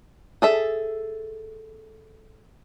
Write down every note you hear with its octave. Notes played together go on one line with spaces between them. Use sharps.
G#4 A4 E5